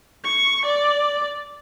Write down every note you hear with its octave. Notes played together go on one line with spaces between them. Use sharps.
C#6
D5